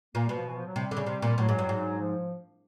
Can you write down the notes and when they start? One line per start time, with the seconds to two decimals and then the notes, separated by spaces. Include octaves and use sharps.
0.15 A#2 A#3
0.24 B2 G3
0.35 F3
0.45 E3
0.55 F3
0.66 F#3
0.76 C3 G3
0.91 D3
0.97 C#3
1.07 C3
1.22 A#2
1.38 A2 F#3
1.49 G#2
1.59 G2
1.69 G#2
1.99 F3